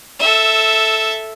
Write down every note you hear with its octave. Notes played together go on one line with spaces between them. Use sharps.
A4 E5